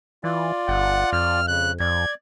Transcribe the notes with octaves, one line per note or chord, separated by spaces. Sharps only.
E3 F4 D5
G1 F#5
F2 F6
C#3 F#6
F2 D5 G#6